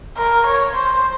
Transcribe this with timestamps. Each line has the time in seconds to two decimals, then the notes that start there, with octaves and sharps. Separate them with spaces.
0.17 A#4
0.47 C#5
0.76 C5